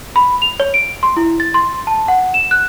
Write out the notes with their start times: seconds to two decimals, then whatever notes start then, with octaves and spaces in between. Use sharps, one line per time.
0.16 B5
0.42 F7
0.60 C#5
0.74 D7
1.03 C6
1.17 E4
1.40 A6
1.54 C6
1.87 A5
2.08 F#5
2.34 E7
2.51 F#6